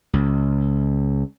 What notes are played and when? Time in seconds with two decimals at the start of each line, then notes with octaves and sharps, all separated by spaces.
0.13 C#2